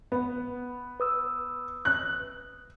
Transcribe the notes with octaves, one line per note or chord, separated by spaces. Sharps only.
B3
B4 D#6 E6
F#6